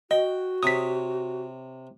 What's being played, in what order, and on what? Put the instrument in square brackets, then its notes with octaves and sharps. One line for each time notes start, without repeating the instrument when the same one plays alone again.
[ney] F#4 [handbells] D#5 [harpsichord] G5
[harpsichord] C3 C#5 [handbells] D#6 B6